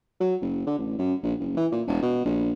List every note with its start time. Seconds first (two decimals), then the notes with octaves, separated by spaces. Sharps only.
0.20 F#3
0.41 F#1
0.66 D3
0.78 A1
0.98 F#2
1.23 A#1
1.40 F#1
1.57 E3
1.72 A#2
1.87 E1
2.02 B2
2.25 A#1